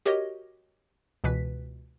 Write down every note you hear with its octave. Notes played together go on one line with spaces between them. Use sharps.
F#4 G4 A#4 C#5 D#5
C#2 B2 E3 B4 B6